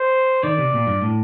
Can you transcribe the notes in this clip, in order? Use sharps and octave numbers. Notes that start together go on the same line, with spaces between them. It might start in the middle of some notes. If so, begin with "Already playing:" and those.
Already playing: C5
D#3 D5
C3
A#2
G2
A2